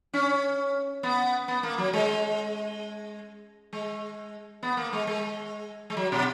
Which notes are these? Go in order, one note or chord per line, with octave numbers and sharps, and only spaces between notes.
C#4
B3
B3
A#3
F#3
G#3
G#3
B3
A#3
G#3
G#3
G#3
F#3
B2